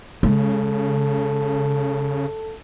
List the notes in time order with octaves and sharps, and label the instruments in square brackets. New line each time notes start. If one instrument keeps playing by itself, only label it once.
[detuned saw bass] C#3 [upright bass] G#3 [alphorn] A4